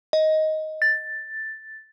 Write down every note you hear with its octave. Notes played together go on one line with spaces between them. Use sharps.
D#5
A6